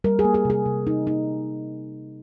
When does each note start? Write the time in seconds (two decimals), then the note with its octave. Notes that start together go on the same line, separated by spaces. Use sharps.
0.04 G3 A#4
0.19 G#4
0.24 A#3
0.34 G#4
0.45 C3 G#4
0.66 C3
0.86 G3 D#4
1.07 A#3 D#4